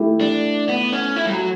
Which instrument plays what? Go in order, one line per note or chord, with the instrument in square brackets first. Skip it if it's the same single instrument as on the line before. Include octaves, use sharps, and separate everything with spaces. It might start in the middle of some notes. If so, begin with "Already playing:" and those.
Already playing: [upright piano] A3 E4 G4
[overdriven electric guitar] D4
B3
C#4
E4
G3
F#3